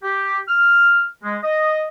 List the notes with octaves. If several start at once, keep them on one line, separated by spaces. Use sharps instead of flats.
G4
F6
G#3
D#5